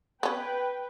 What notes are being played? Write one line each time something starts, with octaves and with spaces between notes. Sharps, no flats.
B3 C#4 B4 G5